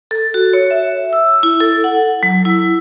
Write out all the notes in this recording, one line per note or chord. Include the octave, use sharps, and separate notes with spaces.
A4
F#4
C#5
E5
E6
E4
A4
F#5
F#3
E4